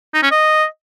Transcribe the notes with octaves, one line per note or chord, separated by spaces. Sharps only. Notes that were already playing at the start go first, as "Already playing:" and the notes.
D#4
C#4
D#5